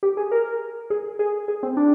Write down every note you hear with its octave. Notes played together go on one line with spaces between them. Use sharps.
G4
G#4
A#4
G#4
G#4
G#4
C4
D4